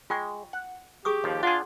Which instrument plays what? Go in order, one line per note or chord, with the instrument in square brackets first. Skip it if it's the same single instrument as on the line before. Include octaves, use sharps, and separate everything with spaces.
[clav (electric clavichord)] G#3 [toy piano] F4 G5 C#6
[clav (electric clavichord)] F#5
[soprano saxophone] G4 [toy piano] G#4 C#6 D#6
[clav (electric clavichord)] D#2 F3
[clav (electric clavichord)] D4 G#4 [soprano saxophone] F4 [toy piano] F#5 C6